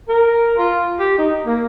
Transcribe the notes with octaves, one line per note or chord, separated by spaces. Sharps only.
A#4
F4
G4
D#4
A#3